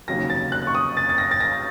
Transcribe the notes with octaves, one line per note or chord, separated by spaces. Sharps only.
F1 D#2 C#3 F#3 A#3 A#6
A6
F#6
C#6
D#6
A6
A6
A#6
A6
A#6